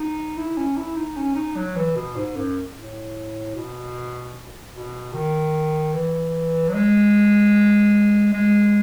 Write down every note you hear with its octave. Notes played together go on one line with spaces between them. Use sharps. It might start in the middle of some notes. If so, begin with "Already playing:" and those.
Already playing: D#4
E4
C#4
E4
D#4
C#4
D#4
F#3
E3
B2
G#2
F#2
A2
B2
B2
D#3
E3
F#3
G#3
G#3